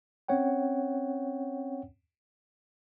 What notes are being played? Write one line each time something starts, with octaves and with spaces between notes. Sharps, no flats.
C4 C#4 C#5 F#5 G5